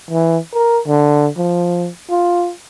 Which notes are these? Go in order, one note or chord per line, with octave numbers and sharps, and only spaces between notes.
E3
A#4
D3
F3
F4